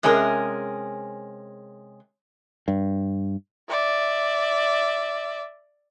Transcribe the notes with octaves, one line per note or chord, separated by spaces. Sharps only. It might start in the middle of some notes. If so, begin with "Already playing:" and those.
C3 G#3 C#4 G#4 A#4
G2
D5 E5